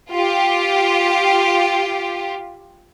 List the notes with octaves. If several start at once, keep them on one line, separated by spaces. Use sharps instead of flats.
F4 G4